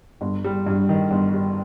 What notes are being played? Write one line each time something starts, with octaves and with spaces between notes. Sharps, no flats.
G1
G3
G2
D#3
G1
G3